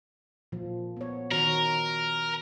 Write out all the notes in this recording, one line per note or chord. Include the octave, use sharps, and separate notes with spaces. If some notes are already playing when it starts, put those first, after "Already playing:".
A#2 F3
B3 C#5
D#3 F#4 A#4 C#5